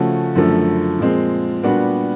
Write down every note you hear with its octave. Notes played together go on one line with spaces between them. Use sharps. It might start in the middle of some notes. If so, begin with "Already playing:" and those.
Already playing: C#3 F3 A3 C#4 F#4
F#2 D3 F3 A3
A#2 F3 G#3 C4
A#2 G3 B3 D4 F#4